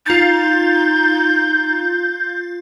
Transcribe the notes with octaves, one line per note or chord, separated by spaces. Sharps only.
D#4 F4 G6 A6